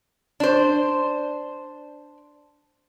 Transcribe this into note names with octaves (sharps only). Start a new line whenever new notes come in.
D4 C5